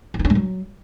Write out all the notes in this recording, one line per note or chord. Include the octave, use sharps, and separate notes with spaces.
E4
D#4
C#4
A3
F#3